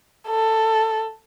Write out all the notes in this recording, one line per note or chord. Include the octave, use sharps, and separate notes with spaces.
A4